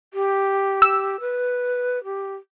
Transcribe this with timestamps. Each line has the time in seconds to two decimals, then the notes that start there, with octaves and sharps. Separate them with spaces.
0.14 G4
0.82 E6
1.20 B4
2.04 G4